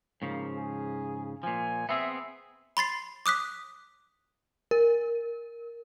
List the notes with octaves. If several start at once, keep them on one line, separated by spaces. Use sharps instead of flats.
G#2 C#3 F3 A#3
G#4
A#2 F3 G#5
B3 C4 G#4 E5
B5 C6 A6 C7
D6 D#6 F#6 B6
A#4